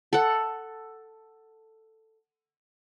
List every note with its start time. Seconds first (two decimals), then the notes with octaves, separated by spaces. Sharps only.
0.13 A4 F#5